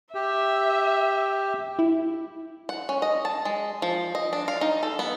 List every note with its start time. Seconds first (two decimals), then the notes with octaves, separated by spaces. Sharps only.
0.15 G4 E5
1.79 E4
2.69 F#5
2.89 C#4
3.02 D#5
3.25 A5
3.45 G#3
3.82 F3
4.15 D#5
4.33 D4
4.48 F5
4.61 D#4
4.83 A4
4.99 B3